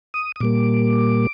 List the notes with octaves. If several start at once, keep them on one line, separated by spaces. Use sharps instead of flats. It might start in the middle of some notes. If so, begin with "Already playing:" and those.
D#6
D#6
A#2 G3 A#3 D6